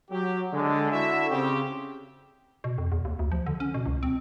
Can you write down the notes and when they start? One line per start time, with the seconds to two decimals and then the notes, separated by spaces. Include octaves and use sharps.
0.11 F#3 G4
0.53 D3 G#3
0.91 D4 E4 F#4 A4 E5
1.30 C#3 C4 G4
2.64 B2
2.78 F2
2.92 E2
3.05 D#2
3.19 D2
3.32 F3
3.46 D3
3.60 C#4
3.74 B2
3.86 C#2
4.03 C4